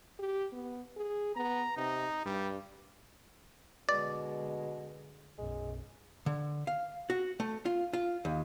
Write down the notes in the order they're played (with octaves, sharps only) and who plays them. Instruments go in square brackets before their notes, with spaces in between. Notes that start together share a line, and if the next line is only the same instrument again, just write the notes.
[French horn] G4
B3
G#4
[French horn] B3 [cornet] A#5
[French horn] C3 [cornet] D#4
[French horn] G2 [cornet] G3
[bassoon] B2 [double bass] D3 G#3 [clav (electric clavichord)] D5
[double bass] B1 F#2 [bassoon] G#3
[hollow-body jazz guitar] D3
F5
F#4
A3
F4
F4
D#2